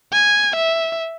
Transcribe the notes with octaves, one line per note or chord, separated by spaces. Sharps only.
G#5
E5